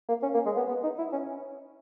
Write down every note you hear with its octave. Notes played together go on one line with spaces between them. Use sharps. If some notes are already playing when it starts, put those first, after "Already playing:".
A#3
C#4
A#3
G#3
B3
B3
D#4
E4
C#4